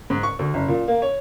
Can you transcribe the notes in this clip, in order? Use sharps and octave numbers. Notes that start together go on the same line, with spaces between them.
G#2
C#6
D2
F#1
A#2
A#3
C#5